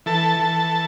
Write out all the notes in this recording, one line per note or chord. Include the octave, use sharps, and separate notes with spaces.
E3 A4 A5
E3